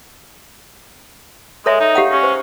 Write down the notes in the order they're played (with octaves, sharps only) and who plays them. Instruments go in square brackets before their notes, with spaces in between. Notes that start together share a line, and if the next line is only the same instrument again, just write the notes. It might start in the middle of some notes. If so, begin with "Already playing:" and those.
[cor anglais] G#3 [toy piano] A4 C#5 E5
[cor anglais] D#4
[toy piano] G4 F5 F#5
[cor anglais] C#4
[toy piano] C5